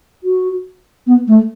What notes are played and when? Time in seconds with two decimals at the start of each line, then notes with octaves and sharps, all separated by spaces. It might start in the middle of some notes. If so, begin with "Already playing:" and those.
0.24 F#4
1.07 B3
1.28 A3